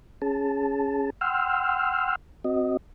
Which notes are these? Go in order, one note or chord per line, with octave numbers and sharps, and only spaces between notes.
C#4 G#4 A5
F#5 G5 C6 E6 F6
C4 F#4 D#5